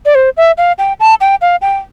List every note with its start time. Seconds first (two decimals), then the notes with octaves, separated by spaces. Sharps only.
0.05 D5
0.15 C5
0.37 E5
0.58 F5
0.78 G5
1.00 A5
1.21 G5
1.41 F5
1.61 G5